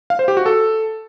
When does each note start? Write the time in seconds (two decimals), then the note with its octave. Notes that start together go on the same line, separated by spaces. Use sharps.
0.10 F5
0.19 C5
0.28 G4
0.37 F#4
0.46 A4